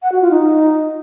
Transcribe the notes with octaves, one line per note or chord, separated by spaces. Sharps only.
F#5
F#4
F4
D#4